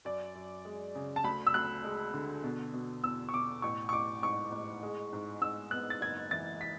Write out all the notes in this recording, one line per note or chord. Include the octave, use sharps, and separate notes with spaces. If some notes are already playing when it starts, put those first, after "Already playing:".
F#2 D5
F#2
G#3
C#3
A5
D2 B5
E6
D2 F#6
G#3
D3
B2
B2
E2 E6
C#6
B2 D6
A1 C#6
C#6
A1 D6
G#2 C#6
A1
G#3
G#2
G#2 E6
B3 F#6
A6
F#1 G#6
E3 A6
B6